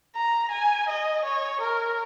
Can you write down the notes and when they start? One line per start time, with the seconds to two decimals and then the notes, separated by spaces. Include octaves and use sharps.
0.16 A#5
0.52 G#5
0.89 D#5
1.25 C#5
1.61 A#4